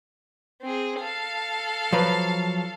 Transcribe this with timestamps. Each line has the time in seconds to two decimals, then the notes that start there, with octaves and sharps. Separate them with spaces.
0.62 C4 G#4
1.00 A4 F5
1.93 F3 F#3 B4